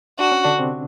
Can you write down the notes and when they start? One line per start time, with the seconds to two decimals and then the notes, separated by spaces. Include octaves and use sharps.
0.19 D4 F#4
0.32 C#4
0.44 D3 D4
0.59 C3 C4